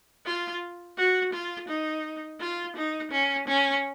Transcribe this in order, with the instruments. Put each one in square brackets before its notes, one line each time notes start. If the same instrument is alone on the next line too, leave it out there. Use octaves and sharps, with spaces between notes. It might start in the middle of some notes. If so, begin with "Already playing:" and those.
[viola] F4
F#4
F4
D#4
F4
D#4
C#4
C#4